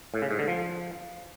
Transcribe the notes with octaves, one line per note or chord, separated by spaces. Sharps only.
A2
C#3
G#2
D3
F3